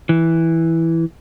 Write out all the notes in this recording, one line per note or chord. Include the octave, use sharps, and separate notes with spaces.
E3